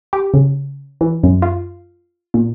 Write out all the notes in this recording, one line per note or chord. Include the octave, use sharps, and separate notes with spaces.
G4
C#3
E3
F#2
F4
A#2